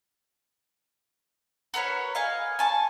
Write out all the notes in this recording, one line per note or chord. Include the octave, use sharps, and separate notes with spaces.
F#4 A#4 B4 C#5
D#5 F5 G#5
G#5 A5 C#6